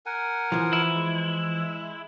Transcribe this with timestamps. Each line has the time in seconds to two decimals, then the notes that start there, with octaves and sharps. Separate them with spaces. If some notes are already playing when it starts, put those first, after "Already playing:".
0.06 A#4 F#5 G#5
0.52 E3 F3
0.73 E4
0.95 G#3